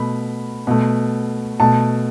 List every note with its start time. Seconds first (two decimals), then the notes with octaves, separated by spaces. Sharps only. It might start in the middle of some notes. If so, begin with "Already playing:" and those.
Already playing: B2 A3 B5
0.67 B2 A3
1.60 B2 A3 A5